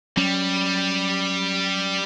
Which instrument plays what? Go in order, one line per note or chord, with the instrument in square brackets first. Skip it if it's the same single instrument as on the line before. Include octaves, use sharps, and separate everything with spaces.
[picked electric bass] F#3 C#4 [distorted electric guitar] G3